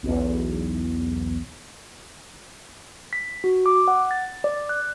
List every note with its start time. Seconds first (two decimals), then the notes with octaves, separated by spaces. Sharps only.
0.03 B1 E2
3.13 B6
3.44 F#4
3.66 D6
3.88 F#5
4.11 A6
4.44 D5
4.69 F#6